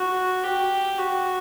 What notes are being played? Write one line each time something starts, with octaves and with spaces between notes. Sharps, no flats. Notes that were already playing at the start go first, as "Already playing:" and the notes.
Already playing: F#4
G4
F#4